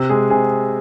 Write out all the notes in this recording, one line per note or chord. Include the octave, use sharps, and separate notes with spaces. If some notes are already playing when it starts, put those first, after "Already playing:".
Already playing: C3
G#3 G#4
C3 G#4